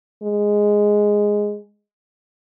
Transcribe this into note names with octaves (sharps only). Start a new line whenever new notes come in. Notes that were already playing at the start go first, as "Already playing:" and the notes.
G#3